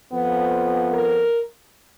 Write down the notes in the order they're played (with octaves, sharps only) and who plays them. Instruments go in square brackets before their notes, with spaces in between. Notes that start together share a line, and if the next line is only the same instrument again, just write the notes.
[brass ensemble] F2 F3 B3
A#4